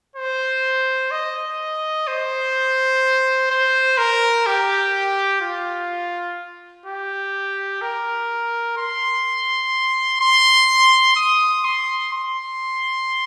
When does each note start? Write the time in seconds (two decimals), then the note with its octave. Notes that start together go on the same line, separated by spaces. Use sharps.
0.16 C5
1.11 D#5
2.07 C5
3.51 C5
3.98 A#4
4.46 G4
5.42 F4
6.86 G4
7.81 A#4
8.77 C6
10.20 C6
11.16 D#6
11.64 C6
12.12 C6